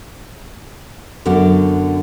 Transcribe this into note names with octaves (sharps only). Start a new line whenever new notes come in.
F#2 D3 B3 F#4 D5